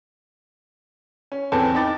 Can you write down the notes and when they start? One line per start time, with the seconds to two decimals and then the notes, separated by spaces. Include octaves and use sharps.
1.32 C#4
1.52 E2 B3 C4 A4 G#5 A5
1.75 D#4 G5 A5 B5 D6 A6